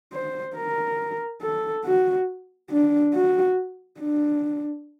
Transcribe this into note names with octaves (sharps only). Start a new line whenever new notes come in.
C5
A#4
A4
F#4
D4
F#4
D4